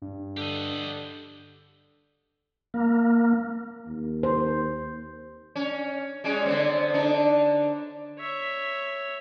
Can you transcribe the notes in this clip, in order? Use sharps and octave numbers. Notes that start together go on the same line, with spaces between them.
G2
D3 G4 D#5
A#3
D#2
C5
C#4
G3 G#3 C#4
D3 B3 C4
D3 D4 D#4
C#5 E5